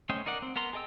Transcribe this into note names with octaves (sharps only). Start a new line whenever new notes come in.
A3 C#4 C5 D#5 G5
D#4 A#4 D5 F#5
C4
B3 A#4 A#5 C6
G#4 A4 D#5 G5 E6